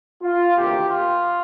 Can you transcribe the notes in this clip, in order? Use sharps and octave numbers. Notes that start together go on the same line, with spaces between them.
F4
D2 C3 D#3 A#3 G4
F4